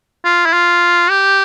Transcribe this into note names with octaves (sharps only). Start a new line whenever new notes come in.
F4
E4
F4
G4